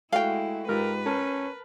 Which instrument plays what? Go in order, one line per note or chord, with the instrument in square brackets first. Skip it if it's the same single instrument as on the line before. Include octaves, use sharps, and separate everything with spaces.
[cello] G#3 E4 [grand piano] A3 F#4 [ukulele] F5 G5
[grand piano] G#2 F4 G4 [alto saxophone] A#4 [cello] B4
[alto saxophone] C#4 [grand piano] A#4 A5